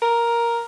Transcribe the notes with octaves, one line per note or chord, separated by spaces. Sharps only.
A#4